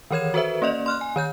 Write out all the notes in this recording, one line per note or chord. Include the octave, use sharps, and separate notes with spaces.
D#3 E3 A#4 C#5 G#6 E7
F#4 A4 B4 C5 E5
A#3 C#4 D5 D#5
C6 F6 F#6
G#5
D#3 C#5 G6